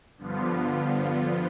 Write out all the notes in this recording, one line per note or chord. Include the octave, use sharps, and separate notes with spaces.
G2 D3 F3 B3 F4